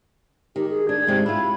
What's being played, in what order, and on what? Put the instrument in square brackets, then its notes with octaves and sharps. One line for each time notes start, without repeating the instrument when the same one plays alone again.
[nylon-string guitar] D#3 [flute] G4
[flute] G#4
[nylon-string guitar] D4 [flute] G#6
[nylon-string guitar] G#2 C3 G#3
[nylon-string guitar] E4 F4 [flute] B5